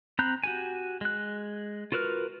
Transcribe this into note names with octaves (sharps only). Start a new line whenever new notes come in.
C4 A#5 B5 F#6 G6
F#4 G4 G#5
G#3 F#6
F4 F#4 A#4 B4 F6